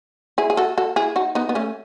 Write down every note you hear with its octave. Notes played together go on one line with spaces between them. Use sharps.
E4 G#4
G#4
F#4 A4
F#4 A4
E4 G#4
D#4 F#4
B3 D#4
B3
A3 C#4